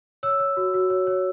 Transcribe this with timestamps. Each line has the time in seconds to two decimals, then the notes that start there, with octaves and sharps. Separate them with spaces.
0.23 C#5 E6
0.40 C#5
0.57 F#4
0.74 F#4
0.90 C#5
1.07 C#5